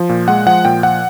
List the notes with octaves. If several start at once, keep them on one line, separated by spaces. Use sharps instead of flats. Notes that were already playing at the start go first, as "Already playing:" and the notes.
Already playing: F3
A#2
G#3 F#5
F3 F#5
A#2 G5
F3 F#5